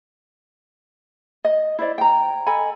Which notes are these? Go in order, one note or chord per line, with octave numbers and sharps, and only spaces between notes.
D#5
E4 C5 D5 D#5
G5 A#5
A4 D#5 G#5 B5